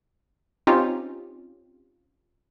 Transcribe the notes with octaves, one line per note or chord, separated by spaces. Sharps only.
C4 C#4 D#4 F4 G4